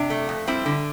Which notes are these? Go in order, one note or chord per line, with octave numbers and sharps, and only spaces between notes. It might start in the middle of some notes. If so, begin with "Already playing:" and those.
Already playing: C3 D4
A3
F2
G3 C4 E4
D3